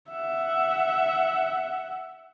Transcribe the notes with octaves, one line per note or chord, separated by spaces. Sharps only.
E5 F#5